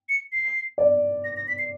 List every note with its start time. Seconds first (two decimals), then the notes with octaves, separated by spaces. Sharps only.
0.09 C#7
0.32 C7
0.78 D5
1.24 A#6
1.37 A#6
1.48 B6
1.59 C7